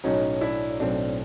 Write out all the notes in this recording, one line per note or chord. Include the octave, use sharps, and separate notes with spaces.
B1 A2 F#3 C#4 D#4
D4 E4
B1 A2 F#3 C4 D4